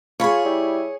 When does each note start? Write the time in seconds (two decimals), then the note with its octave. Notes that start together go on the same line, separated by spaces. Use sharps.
0.20 F4 G#4 C#5 B5 C#6
0.45 G3 E4